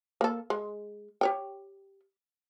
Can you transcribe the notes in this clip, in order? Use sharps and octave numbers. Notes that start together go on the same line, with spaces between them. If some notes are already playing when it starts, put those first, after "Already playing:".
A#3 A4
G#3
G4 C#5 G5